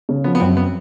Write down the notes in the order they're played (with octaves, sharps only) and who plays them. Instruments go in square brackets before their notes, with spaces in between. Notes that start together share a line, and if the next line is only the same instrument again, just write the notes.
[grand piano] C#3
[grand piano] F3 [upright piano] B3
[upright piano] B3
[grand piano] F#2 [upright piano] C4
[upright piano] B3